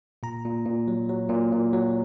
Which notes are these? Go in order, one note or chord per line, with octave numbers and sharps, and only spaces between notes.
A#2 A#5
A#2
A#2
F#3
F#3
A#2
A#2
F#3